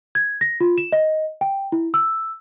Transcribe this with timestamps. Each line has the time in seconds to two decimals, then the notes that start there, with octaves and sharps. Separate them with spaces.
0.15 G#6
0.41 A#6
0.61 F4
0.78 E7
0.92 D#5
1.41 G5
1.72 E4
1.94 E6